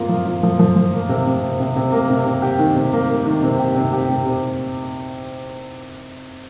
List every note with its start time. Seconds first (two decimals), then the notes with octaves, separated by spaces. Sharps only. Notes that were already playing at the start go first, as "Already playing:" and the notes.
Already playing: C3 A#3 F4
0.09 F3
0.26 F4
0.43 F3
0.59 F3
0.76 F3
0.93 A#3
1.09 C3
1.26 C3
1.43 C3
1.60 C3
1.76 C3
1.92 A#3
2.10 C3
2.26 C3
2.42 G4
2.59 D#3
2.76 C3
2.93 A#3
3.09 A#3
3.26 D#3
3.43 C3
3.59 G4
3.76 C3
3.93 G4
4.09 C3
4.26 C3